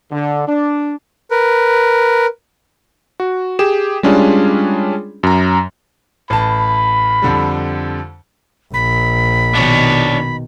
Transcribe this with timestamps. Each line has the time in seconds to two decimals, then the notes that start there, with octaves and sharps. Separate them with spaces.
0.12 D3
0.48 D4
1.31 A#4 B4
3.20 F#4
3.59 G4 G#4 E7
4.03 G3 G#3 C#4 D4 F4 G#4
5.23 F#2 A#5
6.30 A1 A5 B5
7.22 F2 D3 G3
8.74 A#1 B5
9.55 B2 D#3 D4 C#5